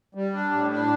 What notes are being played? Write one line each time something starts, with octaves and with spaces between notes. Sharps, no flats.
G3
D4
A2
D4